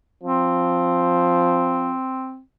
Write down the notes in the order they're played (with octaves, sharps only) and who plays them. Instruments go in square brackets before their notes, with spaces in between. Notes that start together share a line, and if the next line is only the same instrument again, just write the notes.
[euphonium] F3 [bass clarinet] C4